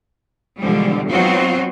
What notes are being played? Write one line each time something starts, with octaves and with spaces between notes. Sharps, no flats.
B2 D3 E3 F3 G3 G#3
F#3 B3 C4 D#4 F4 F#4